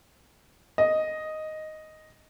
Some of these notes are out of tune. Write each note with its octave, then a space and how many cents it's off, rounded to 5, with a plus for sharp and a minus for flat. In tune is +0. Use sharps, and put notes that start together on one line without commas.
D#5 +0